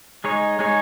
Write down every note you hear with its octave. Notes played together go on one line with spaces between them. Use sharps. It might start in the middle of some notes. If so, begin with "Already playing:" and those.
G#3 D#4 G#4 C#5
G#3 D#4 G#4 C#5